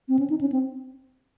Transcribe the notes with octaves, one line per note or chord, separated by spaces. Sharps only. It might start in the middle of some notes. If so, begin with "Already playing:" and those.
C4
C#4
D#4
C#4
C4